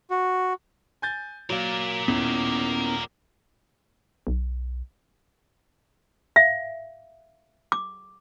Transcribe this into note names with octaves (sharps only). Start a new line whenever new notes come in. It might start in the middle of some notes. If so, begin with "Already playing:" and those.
F#4
G#5 G6 A6
F#3 A#3 A#4 D5
D#1 B3 C#4 E4
B1
E5 F5
D6